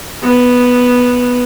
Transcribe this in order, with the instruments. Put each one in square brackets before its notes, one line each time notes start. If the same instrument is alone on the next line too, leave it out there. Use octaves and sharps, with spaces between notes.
[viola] B3